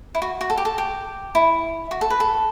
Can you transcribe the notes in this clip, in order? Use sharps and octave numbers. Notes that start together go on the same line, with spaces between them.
E4
F#4
F#4
A4
G4
A4
G4
E4
F#4
A4
B4
A4